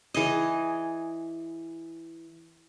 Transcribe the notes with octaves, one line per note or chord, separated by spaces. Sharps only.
E3 G#4 D#5